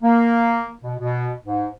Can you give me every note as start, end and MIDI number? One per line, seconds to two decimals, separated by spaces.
0.03 0.68 58
0.84 0.94 47
1.00 1.31 47
1.46 1.67 44